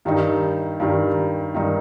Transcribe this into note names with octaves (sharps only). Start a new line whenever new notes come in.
G2 D#3 G3 D#4
G2 D#3 G3 D#4
G2 D#3 G3 D#4